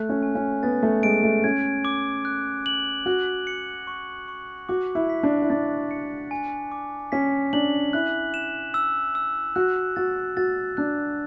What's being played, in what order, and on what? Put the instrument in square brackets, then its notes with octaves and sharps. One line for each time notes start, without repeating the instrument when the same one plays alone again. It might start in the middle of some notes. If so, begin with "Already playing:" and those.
Already playing: [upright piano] A3 [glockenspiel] F#6
[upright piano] C#4
[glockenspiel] G#5
[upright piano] C#4
[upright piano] B3 [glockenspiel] A6
[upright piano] A3
[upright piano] G#3 [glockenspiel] D7
[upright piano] A3
[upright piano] C#4 [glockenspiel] G#6
[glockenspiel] D6
F#6
F#7
[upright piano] F#4 [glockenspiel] F#6
[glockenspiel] C#7
C#6
C#6
[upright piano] F#4 [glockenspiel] D6
[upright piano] E4
[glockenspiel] B6
[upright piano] D4
E4
[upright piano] D4 [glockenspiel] A6
[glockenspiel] C#7
G#5
D6
[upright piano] C#4 [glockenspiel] B6
[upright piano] D4 [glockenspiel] F#7
[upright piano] E4 [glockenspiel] F#6
[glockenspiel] E7
E6
E6
[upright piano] F#4 [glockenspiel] F#6
[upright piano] F#4 [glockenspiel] A6
[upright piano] F#4 [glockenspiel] A6
[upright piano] D4 [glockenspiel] F#6